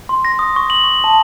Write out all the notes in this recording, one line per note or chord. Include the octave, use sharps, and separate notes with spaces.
C6
A#6
D#6
C#6
F#7
C#6
A5